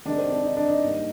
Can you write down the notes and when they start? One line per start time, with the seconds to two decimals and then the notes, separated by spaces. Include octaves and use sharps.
0.05 C3 D#3 G#3 D4
0.18 C4
0.30 D4
0.43 D#4
0.57 D4
0.69 D#4
0.82 G#2 G3 A#3